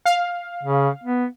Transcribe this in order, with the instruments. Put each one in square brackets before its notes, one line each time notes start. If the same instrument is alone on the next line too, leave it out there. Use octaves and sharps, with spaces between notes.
[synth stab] F5
[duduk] C#3
B3